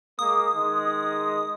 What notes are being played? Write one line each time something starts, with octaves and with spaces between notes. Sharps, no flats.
G#3 A#3 D#6
D#3 G#3